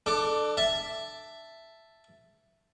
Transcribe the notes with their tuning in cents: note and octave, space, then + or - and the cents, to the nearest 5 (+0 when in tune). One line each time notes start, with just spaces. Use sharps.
D4 +30 A4 +0 D6 +0
E5 +5 A5 +0